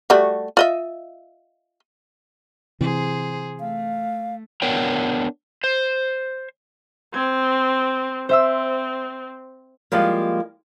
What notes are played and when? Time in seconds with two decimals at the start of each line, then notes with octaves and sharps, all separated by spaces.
0.10 G3 A3 F#4
0.57 F4 D#5 E5
2.81 C3 E3 G#4 C5
3.60 A3 F5
4.62 B3 D4 A#4 C#5 G5
5.64 C5
7.14 C4 G#6
8.29 C4 C5 E5 E6
9.92 F3 G3 G#3 A#3